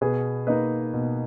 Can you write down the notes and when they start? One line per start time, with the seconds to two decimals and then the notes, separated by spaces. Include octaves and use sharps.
0.01 B2 G#4 B4
0.47 A#3 D#4 B4 D#5
0.93 B2